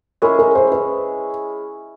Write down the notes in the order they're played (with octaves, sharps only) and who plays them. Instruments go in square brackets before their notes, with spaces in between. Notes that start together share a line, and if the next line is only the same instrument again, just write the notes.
[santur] G#3 C#4 E4 G#4 [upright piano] A#4
[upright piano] A#4
C5
B4